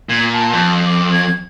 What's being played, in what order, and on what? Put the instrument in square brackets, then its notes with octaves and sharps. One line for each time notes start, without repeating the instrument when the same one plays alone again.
[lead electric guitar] A#2 [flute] G#6
[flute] A5
[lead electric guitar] F2
[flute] D6
G#6